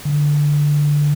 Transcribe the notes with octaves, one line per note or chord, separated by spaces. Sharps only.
D3